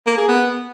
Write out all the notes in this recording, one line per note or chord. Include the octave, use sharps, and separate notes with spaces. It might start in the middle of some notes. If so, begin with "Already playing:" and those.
A#3
G#4
B3